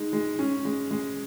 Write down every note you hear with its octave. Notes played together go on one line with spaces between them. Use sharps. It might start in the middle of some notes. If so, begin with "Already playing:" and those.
Already playing: G#3 D#4
G#3
C#4
G#3
G#3